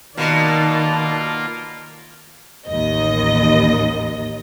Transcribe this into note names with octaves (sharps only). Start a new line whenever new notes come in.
B2 D#3 A#3 F4 D5 A5
A1 D#2 D#5